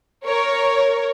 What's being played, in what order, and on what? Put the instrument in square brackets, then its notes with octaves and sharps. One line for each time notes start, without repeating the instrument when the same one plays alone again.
[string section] A#4 C#5